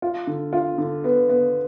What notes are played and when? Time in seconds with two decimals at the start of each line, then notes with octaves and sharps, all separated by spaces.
0.02 F4
0.27 D3
0.53 F4
0.78 D3
1.04 B3
1.29 B3